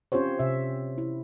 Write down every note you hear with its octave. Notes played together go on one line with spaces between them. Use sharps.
C4 C#4 F4 G4 C5 C#5
C3 E5
E4